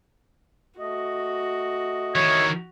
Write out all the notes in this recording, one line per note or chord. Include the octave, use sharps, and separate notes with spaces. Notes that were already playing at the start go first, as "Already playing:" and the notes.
A3 F#4 D#5
D#3 E3 C#5